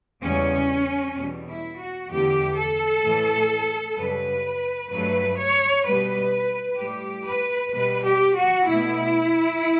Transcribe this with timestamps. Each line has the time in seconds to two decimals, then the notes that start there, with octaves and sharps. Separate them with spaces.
0.23 E2 C#3 G3 C#4
1.16 E2 B2 G3
1.47 E4
1.78 F#4
2.09 E2 D3 A3 G4
2.56 A4
3.03 A2 E3 A3
3.97 F#2 C#3 G3 B4
4.90 G2 F#3 A3 B4
5.38 C#5
5.84 B2 G3 B4
6.77 A2 G3 G4
7.25 B4
7.72 B2 G3 B4
8.02 G4
8.34 F#4
8.64 B2 A3 E4